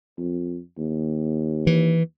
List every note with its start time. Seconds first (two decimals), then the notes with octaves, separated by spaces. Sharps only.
0.18 F2
0.78 D#2
1.67 E3